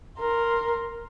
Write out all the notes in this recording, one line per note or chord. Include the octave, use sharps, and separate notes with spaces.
A#4 C6